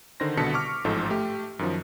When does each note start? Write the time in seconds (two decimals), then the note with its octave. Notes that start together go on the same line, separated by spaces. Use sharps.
0.20 D3 D#3 C5 C6 A#6
0.37 C2 B2 D3 A5 B6 C#7
0.54 C#6 D6 F6
0.85 A1 G#2 F3 A4 C5
1.10 A3 G4
1.59 F#2 D#3 F3